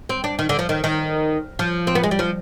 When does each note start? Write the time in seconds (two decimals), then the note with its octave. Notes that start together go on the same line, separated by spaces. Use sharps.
0.09 C4
0.24 D4
0.39 D#3
0.49 D3
0.59 F3
0.69 D#3
0.84 D#3
1.59 F3
1.87 C4
1.95 B3
2.03 G#3
2.11 G3
2.19 F3